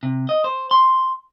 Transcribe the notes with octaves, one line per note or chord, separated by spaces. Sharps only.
C3
D#5
C5
C6